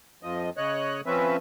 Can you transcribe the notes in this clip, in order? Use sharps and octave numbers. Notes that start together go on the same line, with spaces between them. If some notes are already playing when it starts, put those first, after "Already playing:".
F2 F3 D#5
C#3 C#5 D#5 F#6
F3 C4 C#4 B4 E5